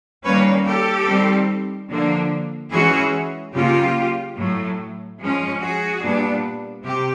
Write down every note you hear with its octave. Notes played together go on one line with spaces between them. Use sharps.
D#3 G3 A#3 C#4 B4 C#5
G4 A4
D#3 G3 C4
D3 F3 A#3 D4
E3 G#3 C#4 F#4 G#4
C#3 F#3 A#3 F4 G4
A2 F#3 A3
F3 G#3 C#4
F#4 G#4
A#2 G3 B3 D4
C3 G4